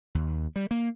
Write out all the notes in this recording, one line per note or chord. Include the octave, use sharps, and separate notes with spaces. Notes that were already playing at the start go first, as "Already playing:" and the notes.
D#2
G3
A#3